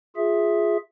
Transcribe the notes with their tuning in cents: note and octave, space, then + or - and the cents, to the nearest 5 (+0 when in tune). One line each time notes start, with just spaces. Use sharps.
F4 +10 G#4 +0 E5 +0